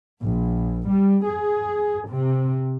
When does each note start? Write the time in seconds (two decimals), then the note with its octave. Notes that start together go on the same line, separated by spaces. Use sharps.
0.21 A#1
0.89 G3
1.26 G#4
2.08 C3